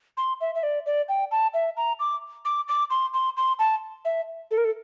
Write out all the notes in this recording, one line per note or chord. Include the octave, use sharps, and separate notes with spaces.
C6
E5
E5
D5
D5
G5
A5
E5
A#5
D6
D6
D6
C6
C6
C6
A5
E5
A4
A#4
A4